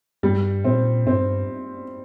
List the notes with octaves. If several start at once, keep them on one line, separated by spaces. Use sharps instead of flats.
G2 G3
A#2 C4
G2 C4